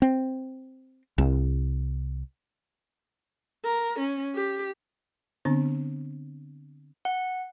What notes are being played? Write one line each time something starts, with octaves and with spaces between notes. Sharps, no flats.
C4
C2
A#4
C#4
G4
D3 B3 C4 D4
F#5